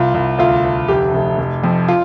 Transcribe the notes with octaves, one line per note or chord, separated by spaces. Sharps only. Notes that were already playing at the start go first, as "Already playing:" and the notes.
Already playing: C2 F4
C2
D2 F4
D2
F1 G4
F1
F1
F2
F4